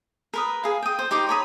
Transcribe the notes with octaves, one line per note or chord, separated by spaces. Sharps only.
A#4 B4 D#6
G#4 F5
G5 D#6
C5
D#4 G4 C6 D6
C#5 A#5 B5 D#6